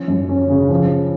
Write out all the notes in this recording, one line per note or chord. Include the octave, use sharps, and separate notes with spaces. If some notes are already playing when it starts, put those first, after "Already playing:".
Already playing: F3 C#4
F#2
C#4
C#3
F3